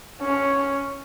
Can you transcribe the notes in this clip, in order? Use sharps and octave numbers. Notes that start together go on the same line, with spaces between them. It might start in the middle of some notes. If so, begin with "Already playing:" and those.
C#4